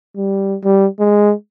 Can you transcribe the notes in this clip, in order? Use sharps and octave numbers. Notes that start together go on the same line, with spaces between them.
G3
G3
G#3